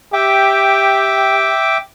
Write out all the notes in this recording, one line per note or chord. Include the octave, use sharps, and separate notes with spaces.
G4 E5 G5 D6